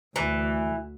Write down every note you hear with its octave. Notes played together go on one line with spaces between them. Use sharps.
D2 E3